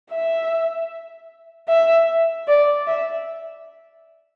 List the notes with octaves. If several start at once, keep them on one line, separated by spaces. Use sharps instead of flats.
E5
E5
D5
E5